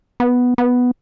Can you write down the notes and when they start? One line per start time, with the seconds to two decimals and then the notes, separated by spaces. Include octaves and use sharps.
0.20 B3
0.58 B3